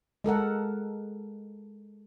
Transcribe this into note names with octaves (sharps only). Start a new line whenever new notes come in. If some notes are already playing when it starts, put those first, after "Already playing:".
G#3 A4 A#4 F#5